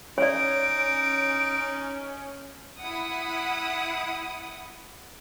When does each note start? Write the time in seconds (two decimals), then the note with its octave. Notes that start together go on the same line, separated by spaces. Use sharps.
0.18 C#4 D#4 C#5 D5 D7
2.80 E4 F#5 D#6